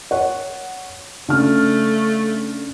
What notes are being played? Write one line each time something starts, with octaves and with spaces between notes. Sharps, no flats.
C#5 F#5
C#3 A3 D4 F6